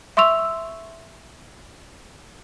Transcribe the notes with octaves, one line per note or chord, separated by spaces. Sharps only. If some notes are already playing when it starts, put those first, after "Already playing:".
E5 C6 C#6 E6 F7